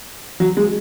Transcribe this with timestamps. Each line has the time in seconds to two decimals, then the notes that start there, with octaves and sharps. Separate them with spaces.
0.40 F#3
0.57 G#3